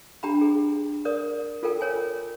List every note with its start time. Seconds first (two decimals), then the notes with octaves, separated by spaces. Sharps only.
0.23 D4 G4 G5 A#5 B5
0.41 G#4
1.05 A#4 D5 D#6
1.63 F4 A4 A#4 G5
1.81 A#4 C#5 G#5